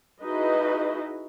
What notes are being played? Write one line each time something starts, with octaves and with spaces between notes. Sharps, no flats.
D#4 E4 F#4 G#4 B4 D#5